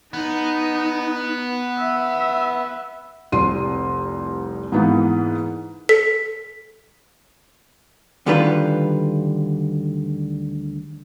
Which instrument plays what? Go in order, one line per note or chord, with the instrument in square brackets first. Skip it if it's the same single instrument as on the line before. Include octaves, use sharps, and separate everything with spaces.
[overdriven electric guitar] B3 [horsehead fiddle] D#4
[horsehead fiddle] E5
[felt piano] F1 C2 C6 D#7
G#2 E3 A#3 B3 D#4 E4
[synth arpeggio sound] A4 C#7 [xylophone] B6
[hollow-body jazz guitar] D2 D3 D#3 G3 F4 B4